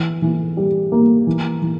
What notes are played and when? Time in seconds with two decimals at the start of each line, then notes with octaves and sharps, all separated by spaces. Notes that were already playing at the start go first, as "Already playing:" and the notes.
Already playing: E3
0.22 E3
0.57 G3
0.92 A#3
1.27 E3
1.62 E3